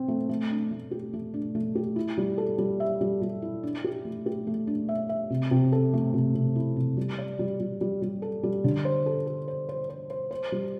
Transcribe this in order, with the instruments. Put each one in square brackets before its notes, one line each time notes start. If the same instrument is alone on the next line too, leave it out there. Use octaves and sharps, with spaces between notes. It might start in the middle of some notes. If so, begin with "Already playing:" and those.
Already playing: [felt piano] C4
A3
A3
D4
A3
G4
A3
D4
A3
G4
E4
G3
A4
G3
E5
G3
G3
E4
D4
G4
A3
G4
A3
D4
E5
E5
C3
C3
A4
A3
C3
C3
E4
C3
G3
D5
G3
G3
G3
G3
A4
G3
D3
C5
A4
A4
C5
C5
C5
C5
C5
G3